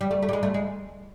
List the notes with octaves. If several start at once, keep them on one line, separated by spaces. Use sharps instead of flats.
G3
A3
A3
G3
G#3
A3
G#3